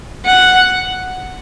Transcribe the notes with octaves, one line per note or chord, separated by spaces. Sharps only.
F#5